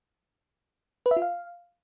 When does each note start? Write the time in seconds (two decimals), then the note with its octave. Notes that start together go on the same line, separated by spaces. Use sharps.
1.06 B4
1.11 E5
1.17 F4
1.22 F5